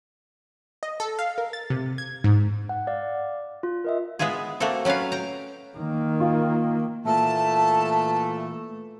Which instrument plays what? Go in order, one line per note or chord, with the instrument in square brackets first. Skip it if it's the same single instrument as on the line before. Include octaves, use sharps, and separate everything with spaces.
[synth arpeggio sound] D#5
A4
F5
A#4
A6
C3
G#6
G#2
[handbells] F#5
D5 F5
F4
A#4 D#5 E5
[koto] G#3 B3 E4 F4 G#4
A3 A#3 C4 F#4 A4
F#3 C#4 F4 B4 F5
G5 A#5
[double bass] D#3 A#3
[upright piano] F4
[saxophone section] A#2 E3 A3 [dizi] A5